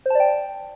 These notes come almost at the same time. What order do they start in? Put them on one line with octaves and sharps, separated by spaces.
C5 A5 D5 G5